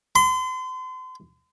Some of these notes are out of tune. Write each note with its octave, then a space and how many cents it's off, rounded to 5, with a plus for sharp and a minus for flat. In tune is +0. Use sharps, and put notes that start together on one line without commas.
C6 -35